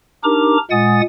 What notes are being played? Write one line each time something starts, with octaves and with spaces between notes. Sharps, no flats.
D4 D#4 G4 A#4 A#5 D6
A#2 G#3 F#5 G#5 D#6 A6